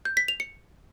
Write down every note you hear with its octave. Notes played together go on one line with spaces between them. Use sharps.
G6
B6
F7
C#7